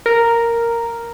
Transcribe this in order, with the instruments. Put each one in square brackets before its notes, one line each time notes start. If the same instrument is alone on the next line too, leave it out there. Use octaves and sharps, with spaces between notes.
[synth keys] A#4